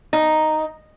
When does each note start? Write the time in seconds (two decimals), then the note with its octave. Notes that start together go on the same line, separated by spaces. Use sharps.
0.13 D#4